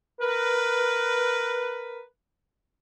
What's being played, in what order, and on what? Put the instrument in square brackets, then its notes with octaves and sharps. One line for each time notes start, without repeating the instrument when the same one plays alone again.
[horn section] A#4 B4